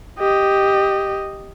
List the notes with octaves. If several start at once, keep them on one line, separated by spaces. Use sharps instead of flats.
G4 D#5